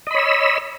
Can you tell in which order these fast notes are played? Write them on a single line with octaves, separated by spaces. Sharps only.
D#5 B5 C#5 E6